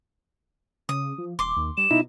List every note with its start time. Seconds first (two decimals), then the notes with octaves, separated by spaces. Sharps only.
0.89 C#3 D#6
1.18 F3
1.39 D#1 C6 D6
1.57 D#2
1.77 G3 E7
1.91 B2 D#4 E4